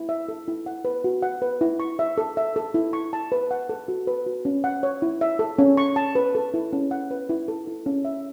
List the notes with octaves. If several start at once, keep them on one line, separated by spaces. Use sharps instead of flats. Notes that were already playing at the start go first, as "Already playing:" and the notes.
Already playing: E4
E5
A4
E4
F#5
B4
F#4
F#5
B4
E4
C#6
E5
A4
E5
A4
E4
C#6
A5
B4
F#5
A4
F#4
B4
F#4
C#4
F#5
C#5
E4
E5
A4
C#4
C#6
A5
B4
A4
E4
C#4
F#5
B4
E4
A4
E4
C#4
E5